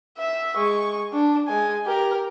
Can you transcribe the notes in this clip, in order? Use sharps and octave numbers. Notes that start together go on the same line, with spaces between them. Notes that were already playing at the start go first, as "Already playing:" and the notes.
E5 E6
G#3 C#6
D4
G#3 G#5
G4 A#4